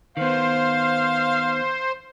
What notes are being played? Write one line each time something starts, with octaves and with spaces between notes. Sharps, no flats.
D#3 B3 C5 F5